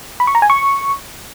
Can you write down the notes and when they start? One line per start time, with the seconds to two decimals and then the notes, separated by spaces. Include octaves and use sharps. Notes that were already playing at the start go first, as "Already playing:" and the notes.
0.20 B5
0.27 C#6
0.35 A#5
0.42 G#5
0.50 C#6